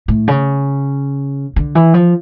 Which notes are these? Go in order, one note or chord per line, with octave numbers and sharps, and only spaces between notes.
A2
C#3
D3
E3
F3